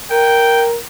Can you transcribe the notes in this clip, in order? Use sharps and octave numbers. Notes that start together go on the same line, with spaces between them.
A#4 G5